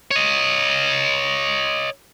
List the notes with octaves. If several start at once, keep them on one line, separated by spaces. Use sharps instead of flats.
C#5 D#5